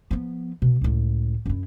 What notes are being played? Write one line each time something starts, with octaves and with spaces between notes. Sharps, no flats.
F3 B3
B2
C#2 A2
F#2 E4